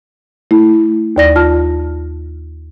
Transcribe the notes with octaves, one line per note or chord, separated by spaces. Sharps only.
A3 E4
D#2 D5 A#6
F4 A5 F6